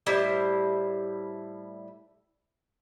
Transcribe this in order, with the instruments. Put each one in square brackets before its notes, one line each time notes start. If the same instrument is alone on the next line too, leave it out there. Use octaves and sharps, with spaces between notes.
[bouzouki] A2 G3 E4 C5